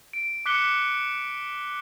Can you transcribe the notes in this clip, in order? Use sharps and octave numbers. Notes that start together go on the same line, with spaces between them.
D7
D6 F#6 B6 C#7 G7